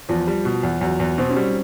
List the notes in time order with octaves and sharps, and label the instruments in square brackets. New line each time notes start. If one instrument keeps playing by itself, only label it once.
[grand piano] E2 [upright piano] F3
[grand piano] G3
B2
E2
[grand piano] E2 [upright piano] F#3
[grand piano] E2
[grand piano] B2 [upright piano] C4
[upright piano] C#4
[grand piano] G3